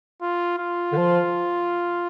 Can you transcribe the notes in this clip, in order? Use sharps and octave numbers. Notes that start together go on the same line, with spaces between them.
F4
F4
D3
F3